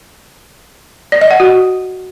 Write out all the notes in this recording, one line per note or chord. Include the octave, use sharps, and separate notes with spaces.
D5
D#5
F#5
F#4